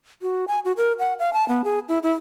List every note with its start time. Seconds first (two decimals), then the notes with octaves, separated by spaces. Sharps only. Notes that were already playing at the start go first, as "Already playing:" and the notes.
0.22 F#4
0.48 G#5
0.65 F#4
0.77 A#4
0.99 F#5
1.19 F5
1.33 A5
1.48 B3
1.64 G#4
1.89 E4
2.03 E4